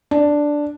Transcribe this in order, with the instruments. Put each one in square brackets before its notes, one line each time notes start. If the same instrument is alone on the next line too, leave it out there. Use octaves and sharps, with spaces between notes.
[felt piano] D4